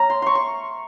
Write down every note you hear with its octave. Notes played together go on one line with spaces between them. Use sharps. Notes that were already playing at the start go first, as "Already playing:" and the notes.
Already playing: A3 C#4 A#5
C6
C6 C#6
C#6